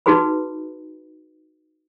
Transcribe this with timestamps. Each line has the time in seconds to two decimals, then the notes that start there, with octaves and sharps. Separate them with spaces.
0.06 D#4 F#4 G#4 B4 B5